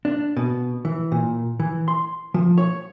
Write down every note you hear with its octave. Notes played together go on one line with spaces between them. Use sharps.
D4
B2
E3
A#2
E3
C6
F3
C#5